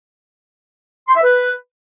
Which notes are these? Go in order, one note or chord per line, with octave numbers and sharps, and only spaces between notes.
C6
E5
B4